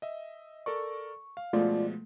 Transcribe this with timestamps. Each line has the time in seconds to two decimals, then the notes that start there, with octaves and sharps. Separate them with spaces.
0.02 D#5 E5
0.66 A4 A#4 D5 C#6
1.37 F5
1.53 B2 F3 G#3 A3 F4 D5